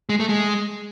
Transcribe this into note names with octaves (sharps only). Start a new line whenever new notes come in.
G#3
A3
G#3